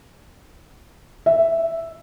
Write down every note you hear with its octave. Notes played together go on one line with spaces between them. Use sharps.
E5